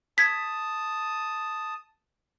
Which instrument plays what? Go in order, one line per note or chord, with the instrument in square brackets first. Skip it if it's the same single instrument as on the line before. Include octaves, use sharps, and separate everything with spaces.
[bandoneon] A5 D#6 [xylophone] G#6 B6